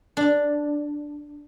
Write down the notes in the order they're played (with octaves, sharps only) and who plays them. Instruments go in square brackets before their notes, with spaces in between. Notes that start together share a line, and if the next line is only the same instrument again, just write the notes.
[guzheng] D4